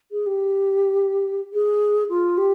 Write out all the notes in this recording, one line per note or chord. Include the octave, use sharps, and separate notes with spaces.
G#4
G4
G#4
F4
G4